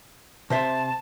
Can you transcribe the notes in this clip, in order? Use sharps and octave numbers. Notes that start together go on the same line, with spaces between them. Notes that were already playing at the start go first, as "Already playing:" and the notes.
C3 C5 E5 A5